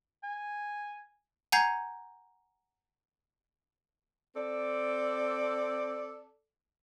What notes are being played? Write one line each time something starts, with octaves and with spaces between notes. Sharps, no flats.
G#5
F#5 G#5 A#5 G6 G#6 C7
C4 A4 D5